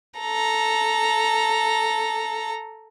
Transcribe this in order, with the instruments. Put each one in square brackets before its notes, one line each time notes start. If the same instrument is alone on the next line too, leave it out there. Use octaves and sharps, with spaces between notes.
[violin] A4 A#5